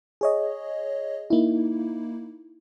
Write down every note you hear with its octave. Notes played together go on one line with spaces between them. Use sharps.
G#4 C#5 D#5
A#3 D#4 E4